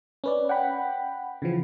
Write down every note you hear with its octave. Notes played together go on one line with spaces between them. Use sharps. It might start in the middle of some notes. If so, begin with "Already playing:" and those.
C#4 B4 D5
F#5 G5 B5
C#3 E3 F3